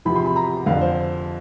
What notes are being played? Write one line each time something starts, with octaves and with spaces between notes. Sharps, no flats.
E2 C3 F3 B5
C6
B5
A#5
F2 D3 F3 F5
C5